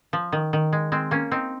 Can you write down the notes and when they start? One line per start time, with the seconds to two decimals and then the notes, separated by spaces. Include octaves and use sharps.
0.13 F3
0.32 D#3
0.53 D#3
0.73 G#3
0.92 G#3 C4
1.11 A#3 C#4
1.31 C4 D#4